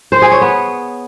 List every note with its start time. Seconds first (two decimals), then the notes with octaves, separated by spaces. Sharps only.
0.12 C5
0.22 G#4
0.32 C#5
0.41 B3